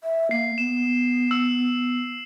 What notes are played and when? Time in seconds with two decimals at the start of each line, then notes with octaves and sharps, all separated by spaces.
0.03 E5
0.31 A#3 C7
0.58 B3 E7
1.31 E6